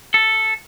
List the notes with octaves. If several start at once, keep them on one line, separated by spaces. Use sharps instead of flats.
A4